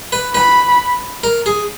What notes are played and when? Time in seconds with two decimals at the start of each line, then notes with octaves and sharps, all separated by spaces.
0.12 B4
0.35 B4 B5
1.24 A#4
1.46 G#4